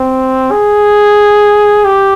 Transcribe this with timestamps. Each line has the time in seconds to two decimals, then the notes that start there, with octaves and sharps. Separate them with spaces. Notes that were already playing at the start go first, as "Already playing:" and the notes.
Already playing: C4
0.51 G#4
1.85 G4